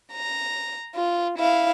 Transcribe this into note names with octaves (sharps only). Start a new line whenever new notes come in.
A#5
F4
E4 F5